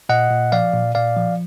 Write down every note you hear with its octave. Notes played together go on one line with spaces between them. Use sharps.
A#2 D#5 F#5
A#2
F3 D5 F5
A#2
A#2 D5 F5
F3